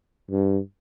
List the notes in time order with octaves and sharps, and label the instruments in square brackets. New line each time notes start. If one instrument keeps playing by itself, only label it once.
[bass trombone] G2